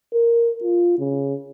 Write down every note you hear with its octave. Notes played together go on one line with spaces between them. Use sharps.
A#4
F4
C#3